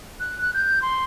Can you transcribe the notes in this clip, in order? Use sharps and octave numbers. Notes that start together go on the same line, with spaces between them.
F#6
F#6
G6
C6